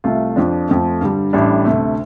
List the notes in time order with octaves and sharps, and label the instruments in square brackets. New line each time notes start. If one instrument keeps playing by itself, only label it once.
[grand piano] C2 C3 A3 F4
F2 F3 D4
F2 F3 A3
G2 D3 G3
A1 A2 G3 D4
D2 C3 A3